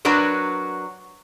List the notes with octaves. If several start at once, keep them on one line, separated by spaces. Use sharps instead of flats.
F#3 D4 F#4 A#4 B4 C#5